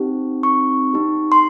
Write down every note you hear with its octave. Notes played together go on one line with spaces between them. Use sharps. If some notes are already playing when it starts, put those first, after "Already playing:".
Already playing: C4 D#4 G4
C#6
C4 D#4 G4
C6